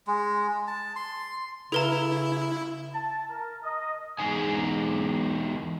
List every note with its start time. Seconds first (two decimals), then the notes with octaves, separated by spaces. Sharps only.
0.07 G#3
0.67 A5
0.96 C6
1.72 C#3 E4 A4 B4 A#5
2.94 A5
3.30 A#4
3.63 D#5
4.19 E2 G#3 D#4 G#5